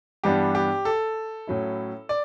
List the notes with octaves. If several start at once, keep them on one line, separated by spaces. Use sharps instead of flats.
G2 E3 G3 B3 D4 G4
G4
A4
A2 F#3 C#4 E4
D5